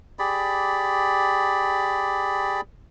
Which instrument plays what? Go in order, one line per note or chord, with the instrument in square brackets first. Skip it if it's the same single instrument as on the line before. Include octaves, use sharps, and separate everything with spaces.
[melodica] G4 G#4 D5 B5